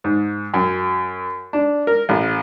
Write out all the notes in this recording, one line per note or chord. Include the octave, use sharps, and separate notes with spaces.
G#2
F#2
D4
A#4
A1